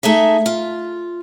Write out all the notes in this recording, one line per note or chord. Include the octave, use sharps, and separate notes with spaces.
A3 D#4 G#4 E5
F4